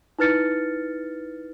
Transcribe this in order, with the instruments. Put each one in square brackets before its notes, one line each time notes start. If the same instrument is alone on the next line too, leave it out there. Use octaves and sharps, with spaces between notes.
[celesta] D#4 E4 B4 F6 A6 C#7